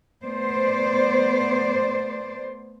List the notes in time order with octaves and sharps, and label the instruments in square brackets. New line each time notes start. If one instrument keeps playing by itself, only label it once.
[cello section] A3 B3 C5 D5